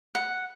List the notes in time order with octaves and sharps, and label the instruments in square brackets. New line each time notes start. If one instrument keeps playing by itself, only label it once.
[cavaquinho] F#5